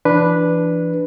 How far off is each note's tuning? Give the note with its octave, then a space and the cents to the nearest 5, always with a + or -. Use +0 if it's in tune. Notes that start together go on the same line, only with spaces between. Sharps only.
E3 +35 D4 +0 B4 +0